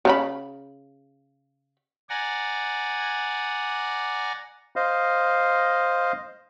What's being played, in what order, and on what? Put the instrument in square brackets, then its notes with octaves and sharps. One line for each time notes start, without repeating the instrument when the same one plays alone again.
[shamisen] C#3 D#4 B5
[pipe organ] D5 F#5 G#5 A#5
[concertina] C5 D#5 F5